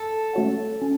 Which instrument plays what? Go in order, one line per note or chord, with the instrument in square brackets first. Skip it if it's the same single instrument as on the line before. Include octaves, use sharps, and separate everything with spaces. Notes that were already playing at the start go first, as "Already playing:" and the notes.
Already playing: [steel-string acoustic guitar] A4
[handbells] A3 C#4 F#4 C#5 F#5
C#4